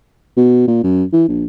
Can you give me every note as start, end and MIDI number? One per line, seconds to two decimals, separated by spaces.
0.37 0.64 47
0.67 0.79 46
0.84 1.04 42
1.13 1.25 52
1.28 1.46 34